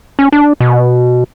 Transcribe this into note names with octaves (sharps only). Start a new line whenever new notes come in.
C#4
D4
B2